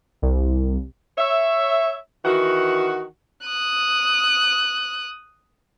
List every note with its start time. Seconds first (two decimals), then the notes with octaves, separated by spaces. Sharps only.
0.22 C2
1.18 C#5 E5
2.24 D#3 E3 F#4
3.46 D#6 F#6